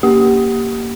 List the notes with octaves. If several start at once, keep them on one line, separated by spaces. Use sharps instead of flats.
A#3 G4